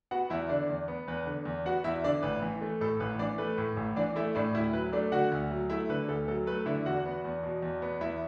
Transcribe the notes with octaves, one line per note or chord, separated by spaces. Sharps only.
B3 F#4 F#5
E2 E4 E5
D3 D4 D5
E2
B3
E2 B4
D3
E2
B3 F#4 F#5
E2 E4 E5
D3 D4 D5
A1 B4
E3
A3
A2 A4
A1 B4
E3 D4 D5
A3 B4
A2
A1
E3 D4 D5
A3 E4 E5
A2 D4 D5
D2 E4 E5
F#3 B4
A3 D4 D5
D3 F#4 F#5
D2
F#3
A3 E4 E5
D3 B4
D2 A4
F#3 A4
A3 B4
D3 E4 E5
E2 F#4 F#5
B3
E2
B2
E2
B3
E2 E4 E5